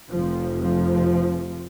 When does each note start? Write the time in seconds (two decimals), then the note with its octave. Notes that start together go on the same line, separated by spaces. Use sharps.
0.11 F1 F2 C3 F3
0.62 F3